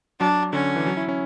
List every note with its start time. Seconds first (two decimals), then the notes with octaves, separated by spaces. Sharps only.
0.20 F#3 D4
0.53 D3 C#4
0.76 E3
0.86 F#3
0.97 E4
1.08 C#4